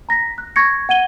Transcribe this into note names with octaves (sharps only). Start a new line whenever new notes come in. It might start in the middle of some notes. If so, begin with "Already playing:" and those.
A#5 A#6 B6
F#6
C#6 G#6 A#6 C#7
F#5 G#6 D#7 G7